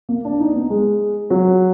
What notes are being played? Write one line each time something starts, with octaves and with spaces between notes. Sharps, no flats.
A#3
D4
D#4
B3
G#3
F#3